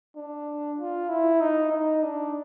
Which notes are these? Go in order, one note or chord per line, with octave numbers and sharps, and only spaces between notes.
D4
F4
E4
D#4
D#4
D4